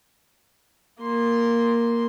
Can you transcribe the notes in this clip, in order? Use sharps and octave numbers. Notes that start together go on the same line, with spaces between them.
A#3 C6